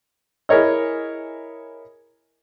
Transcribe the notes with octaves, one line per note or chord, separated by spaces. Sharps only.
E4 G#4 A#4 C#5 D#5